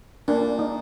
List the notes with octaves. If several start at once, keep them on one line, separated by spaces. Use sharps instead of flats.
A#2 D4
D#4